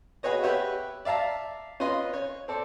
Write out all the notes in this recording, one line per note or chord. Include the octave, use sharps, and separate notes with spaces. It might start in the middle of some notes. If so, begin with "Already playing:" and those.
F#4 G#4 B4 C#5 D#5
G4 B4 C#5 E5 F#5
D5 E5 F5 A5 A#5
C#4 F4 B4 D#5 C6
C#5
C4 A4 D5